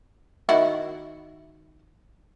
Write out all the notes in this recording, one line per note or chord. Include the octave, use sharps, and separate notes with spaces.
D#3 E4 F#4